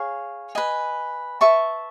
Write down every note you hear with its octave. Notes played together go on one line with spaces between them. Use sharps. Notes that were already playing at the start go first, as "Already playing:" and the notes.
Already playing: G#4 C#5 F5
B4 D#5 G#5
B4 E5 A5 C#6